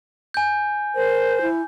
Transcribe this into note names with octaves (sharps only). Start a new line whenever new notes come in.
G#5 G6
A#4 C5
E4